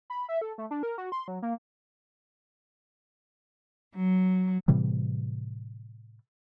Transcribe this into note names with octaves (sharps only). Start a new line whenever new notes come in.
B5
E5
A4
A3
D4
A#4
F#4
C6
F#3
A#3
F#3
A2 C3 E3 G3